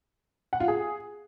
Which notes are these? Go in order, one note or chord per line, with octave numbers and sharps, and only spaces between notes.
F#5
F4
G#4